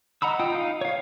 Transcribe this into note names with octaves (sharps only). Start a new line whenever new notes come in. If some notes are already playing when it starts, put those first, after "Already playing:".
D#5 F#5 A#5 B5 E6
F4 D#5 G5
D#4 F5
C#5 F5